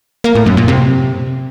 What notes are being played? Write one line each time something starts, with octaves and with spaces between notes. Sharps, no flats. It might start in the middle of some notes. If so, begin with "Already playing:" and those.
A#3
A2
F#2
A#2
C3